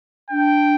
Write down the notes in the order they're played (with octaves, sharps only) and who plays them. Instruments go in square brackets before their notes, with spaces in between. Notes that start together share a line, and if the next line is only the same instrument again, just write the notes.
[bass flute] D4 [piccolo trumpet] G5